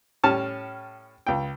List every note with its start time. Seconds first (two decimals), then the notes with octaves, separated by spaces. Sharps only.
0.24 A2 G3 C#4 A5 F6
1.27 C#2 G5